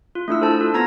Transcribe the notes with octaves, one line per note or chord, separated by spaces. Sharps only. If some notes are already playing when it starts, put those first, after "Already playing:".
F4
A3 D4 E4 E6
A4 C5 A5
F4
B3 A#5 G#6 A#6